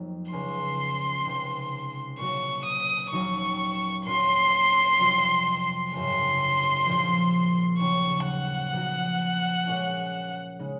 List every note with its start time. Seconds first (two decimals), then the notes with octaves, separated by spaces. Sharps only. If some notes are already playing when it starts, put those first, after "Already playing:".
Already playing: F2 D#3 F#3 A#3
0.32 C#2 C#3 G#3 C#4 C6
1.25 C#2 C3 D#3
2.19 A#2 F#3 C#4 F#4 C#6
2.66 D#6
3.12 D#2 D#3 F#3 C#4 C#6
4.05 A#2 F#3 C#4 F#4 C6
4.99 F2 C3 F#3 C4 F4
5.92 G#1 F#2 C#3 G#3 C6
6.86 A#1 A#2 F3
7.78 D#2 C#3 F#3 C#6
8.26 F#5
8.72 A#2 F3 A#3 D#4 F#4
9.65 A#2 G#3 C#4 F4
10.59 C#3 G#3 D#4